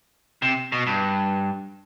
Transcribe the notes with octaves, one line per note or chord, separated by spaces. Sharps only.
C3
B2
G2